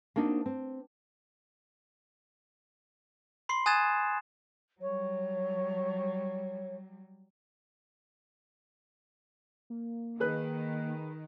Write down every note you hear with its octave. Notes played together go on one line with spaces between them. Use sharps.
A#3 C4 D4 D#4 F#4
C4
B5 C6 C7
G#5 D#6 F#6 G#6 A6 E7
F#3 G3 C#5
A#3
D#3 G#4 B4 F#6